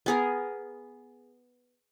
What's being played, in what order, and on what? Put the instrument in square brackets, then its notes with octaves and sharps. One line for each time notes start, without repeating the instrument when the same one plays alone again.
[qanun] B3 G#4 A#4